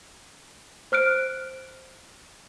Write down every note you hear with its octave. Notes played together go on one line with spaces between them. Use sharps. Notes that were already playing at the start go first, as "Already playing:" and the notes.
C5 F6 F#6 D7